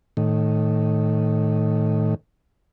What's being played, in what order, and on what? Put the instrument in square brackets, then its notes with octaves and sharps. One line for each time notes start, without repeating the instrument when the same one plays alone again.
[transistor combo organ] A2 D#3